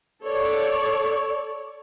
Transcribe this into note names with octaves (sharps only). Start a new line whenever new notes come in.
A4 C#5 D5